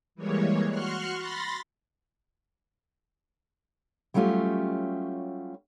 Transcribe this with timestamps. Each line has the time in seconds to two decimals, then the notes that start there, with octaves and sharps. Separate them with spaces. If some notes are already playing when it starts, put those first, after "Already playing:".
0.15 E3 G3 G#3 A#3 C#5
0.69 F#4 C6 C#6 F6 F#6
1.17 B5 C6 A6 A#6
4.14 F#3 G3 A3 C#4 F4 G4